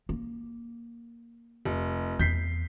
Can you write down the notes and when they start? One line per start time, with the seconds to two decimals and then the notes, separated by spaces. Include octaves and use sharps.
0.09 A#3
1.65 F1
2.19 E2 G6 B6 C7